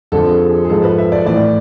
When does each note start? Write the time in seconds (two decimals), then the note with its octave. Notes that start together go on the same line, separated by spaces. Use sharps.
0.12 F2 D3 F3 A4
0.31 G#4
0.51 G#4
0.65 G#4
0.70 G#2 F3 A4
0.84 B4
0.98 E5
1.12 D5
1.26 A2 E3 D5